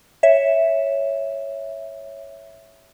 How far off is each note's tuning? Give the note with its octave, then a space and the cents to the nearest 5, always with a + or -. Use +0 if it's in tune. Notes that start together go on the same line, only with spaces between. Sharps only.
C#5 +0 E5 +0